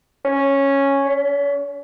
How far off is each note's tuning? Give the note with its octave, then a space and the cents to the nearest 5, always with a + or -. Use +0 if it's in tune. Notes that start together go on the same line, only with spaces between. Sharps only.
C#4 -5
C#4 +40